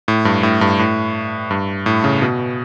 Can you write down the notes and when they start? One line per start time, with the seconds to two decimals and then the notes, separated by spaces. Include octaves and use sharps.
0.08 A2
0.25 G2
0.43 A2
0.61 G2
0.79 A2
1.51 G2
1.86 A2
2.04 C#3
2.22 B2